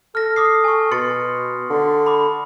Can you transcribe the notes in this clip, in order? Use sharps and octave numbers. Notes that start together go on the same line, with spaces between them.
A4 F6 A#6
D6 D#6 C7
G#5 C#6
B2 C6 A6 C#7
D3
B5 D6